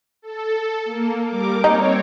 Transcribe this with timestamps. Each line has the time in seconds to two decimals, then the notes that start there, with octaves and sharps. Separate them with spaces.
0.22 A4
0.86 A#3
1.26 G3 A#4 D6
1.64 C4 D#4 C#5